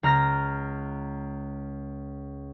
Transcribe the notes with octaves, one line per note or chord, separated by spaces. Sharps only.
C#2 A#5 F6 A#6